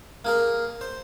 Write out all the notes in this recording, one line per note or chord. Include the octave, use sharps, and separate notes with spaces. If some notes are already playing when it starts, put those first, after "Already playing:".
A#3 G#4 A#4
C5